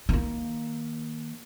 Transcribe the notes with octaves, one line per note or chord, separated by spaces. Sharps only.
D#3 A#3